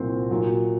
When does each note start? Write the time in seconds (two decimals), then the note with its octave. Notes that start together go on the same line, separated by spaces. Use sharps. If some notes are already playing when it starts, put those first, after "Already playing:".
Already playing: C2 A#2 F#3 C4 F#4
0.31 A#2 F#3